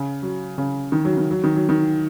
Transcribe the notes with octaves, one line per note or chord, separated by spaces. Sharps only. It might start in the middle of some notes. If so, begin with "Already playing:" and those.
Already playing: C#3
F#3
C#3
D#3
F#3
D#3
F#3
D#3
F#3
D#3